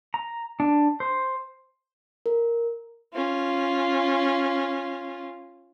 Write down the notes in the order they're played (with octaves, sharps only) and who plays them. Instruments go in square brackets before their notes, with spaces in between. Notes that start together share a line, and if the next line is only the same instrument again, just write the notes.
[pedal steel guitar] A#5
D4
C5
[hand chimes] A#4
[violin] C#4 F4